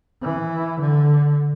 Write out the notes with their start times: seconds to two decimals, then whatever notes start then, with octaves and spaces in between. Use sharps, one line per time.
0.22 E3
0.80 D3